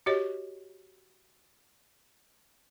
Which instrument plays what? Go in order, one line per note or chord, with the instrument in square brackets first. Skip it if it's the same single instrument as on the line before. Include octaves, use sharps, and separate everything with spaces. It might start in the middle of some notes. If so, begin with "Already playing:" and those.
[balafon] F#4 G4 C#5 D#5